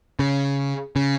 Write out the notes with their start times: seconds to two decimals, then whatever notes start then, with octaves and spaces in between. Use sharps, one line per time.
0.19 C#3
0.96 C#3